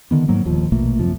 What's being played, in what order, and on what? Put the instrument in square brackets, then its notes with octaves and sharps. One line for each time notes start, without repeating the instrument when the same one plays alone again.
[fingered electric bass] D3 D#3 B3
G#2 F#3 A#3
D#1 D#2 F3
A#1 B2 A3 A#3
F#2 C3 F3